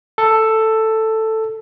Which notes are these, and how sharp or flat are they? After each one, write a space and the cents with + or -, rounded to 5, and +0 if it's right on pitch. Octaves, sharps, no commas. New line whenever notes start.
A4 +5